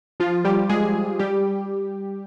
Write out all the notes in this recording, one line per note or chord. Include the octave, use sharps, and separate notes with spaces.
F3 F4
G3 G4
G#3 G#4
G3 G4